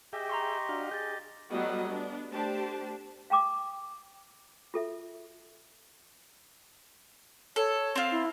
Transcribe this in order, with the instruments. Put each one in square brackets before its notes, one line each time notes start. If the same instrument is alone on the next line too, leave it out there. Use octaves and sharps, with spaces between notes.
[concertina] G4 D#5 [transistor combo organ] G#4 E5 G5
[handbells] A#5 C6 C#6
[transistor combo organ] D4 F#4 F5
[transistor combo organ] G#4 [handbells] G6 A6
[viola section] F#3 G3 A3 B3 F#4 D#5
B3 D4
A3 D4 G4 C5 A5
[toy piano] F5 G5 A#5 D6 D#6
F4 A4 E5
[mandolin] A4 [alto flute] C#5
[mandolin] C4 F4
[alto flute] E4